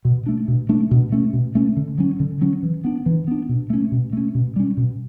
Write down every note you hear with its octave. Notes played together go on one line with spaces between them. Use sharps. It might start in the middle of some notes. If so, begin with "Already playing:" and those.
B2
A3 D4
B2
A3 D4
B2
A3 C#4
B2
A3 C#4
D3
F#3 C#4
D3
F#3 C#4
E3
B3 D4
E3
B3 D4
B2
A3 C#4
B2
A3 C#4
B2
G3 C#4
B2